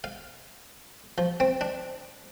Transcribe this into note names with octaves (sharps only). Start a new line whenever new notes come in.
F5
F3
C4
D4